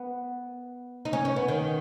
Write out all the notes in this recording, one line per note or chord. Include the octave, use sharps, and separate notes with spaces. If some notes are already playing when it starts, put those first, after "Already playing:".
Already playing: B3
D#4
C#4
C#4
B3
D#3